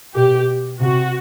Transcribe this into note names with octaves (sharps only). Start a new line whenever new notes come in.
B2 G4
C3 F#4